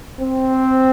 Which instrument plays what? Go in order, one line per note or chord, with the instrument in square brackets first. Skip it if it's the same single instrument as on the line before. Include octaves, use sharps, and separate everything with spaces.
[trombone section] C4